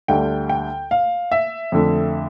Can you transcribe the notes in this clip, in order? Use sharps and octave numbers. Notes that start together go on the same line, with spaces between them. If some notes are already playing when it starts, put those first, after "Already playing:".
D2 D3 G3 G5
G5
F5
E5
F2 D3 A3